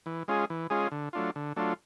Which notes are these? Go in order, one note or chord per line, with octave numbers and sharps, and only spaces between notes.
E3
G#3 C#4 F4 G#4
E3
G#3 C#4 F4 G#4
D3
F#3 A3 D4 F4
D3
F#3 A3 D4 F4